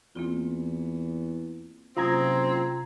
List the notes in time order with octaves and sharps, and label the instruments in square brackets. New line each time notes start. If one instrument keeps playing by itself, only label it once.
[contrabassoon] E2 [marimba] A#3 C4 F4
[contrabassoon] F#1 [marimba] C3 D#6 [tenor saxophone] C4 [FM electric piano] F4 A#5 G#6